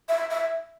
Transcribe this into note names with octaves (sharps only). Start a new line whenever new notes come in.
E5
E5